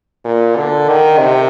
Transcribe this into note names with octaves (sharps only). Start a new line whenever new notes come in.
A#2
D3
D#3
C3